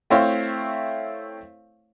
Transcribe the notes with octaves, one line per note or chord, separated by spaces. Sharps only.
A3 C4 E4 C5 C#5 F5